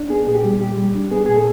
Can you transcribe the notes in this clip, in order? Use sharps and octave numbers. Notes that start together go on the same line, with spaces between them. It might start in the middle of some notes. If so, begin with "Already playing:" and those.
Already playing: D4
B3 G#4
A#2 G#4
G4
G3
A#2 G4
G3
D4
B3 G#4
A#2 G#4
A4